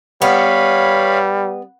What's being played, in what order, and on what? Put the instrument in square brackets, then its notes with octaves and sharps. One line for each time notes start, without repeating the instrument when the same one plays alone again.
[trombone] G3 [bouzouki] B3 [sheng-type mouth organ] C#5 F5 B5